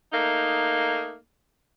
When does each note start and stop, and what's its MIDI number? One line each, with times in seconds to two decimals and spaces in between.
0.13 1.15 57
0.13 1.15 58
0.13 1.15 63